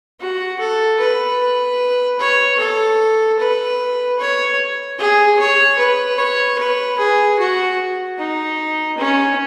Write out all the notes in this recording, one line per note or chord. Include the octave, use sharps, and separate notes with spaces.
F#4
A4
B4
C#5
A4
B4
C#5
G#4
C#5
B4
C#5
B4
G#4
F#4
D#4
C#4